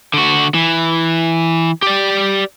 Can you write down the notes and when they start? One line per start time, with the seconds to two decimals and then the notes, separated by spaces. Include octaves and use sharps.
0.14 D3 F#4
0.54 E3
1.82 G4 D5